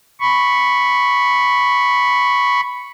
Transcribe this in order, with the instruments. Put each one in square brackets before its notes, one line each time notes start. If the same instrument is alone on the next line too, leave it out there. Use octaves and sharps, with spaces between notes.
[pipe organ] B5 C#6